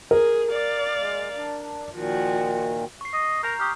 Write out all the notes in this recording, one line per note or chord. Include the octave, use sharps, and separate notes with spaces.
G#4 A#4
D5 F5
G#3
D4
A#2 D#3 F3 F#4
C#6 C7
D#5
A#4 A#5 G6
G4 C#6 D#6 F6